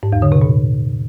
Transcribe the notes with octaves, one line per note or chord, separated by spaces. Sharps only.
G#2
E2
D3
C3
A#2